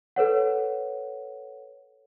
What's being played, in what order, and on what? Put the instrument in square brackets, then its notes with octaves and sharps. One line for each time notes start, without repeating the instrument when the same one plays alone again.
[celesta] A4 B4 C#5 F#5